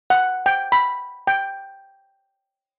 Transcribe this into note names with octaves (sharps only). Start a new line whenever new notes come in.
F#5
G5
B5
G5